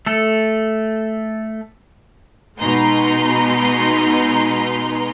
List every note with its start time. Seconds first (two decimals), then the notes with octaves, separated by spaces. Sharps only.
0.06 A3 A4
2.60 B2 G#3 D#4 B4 A#5 C6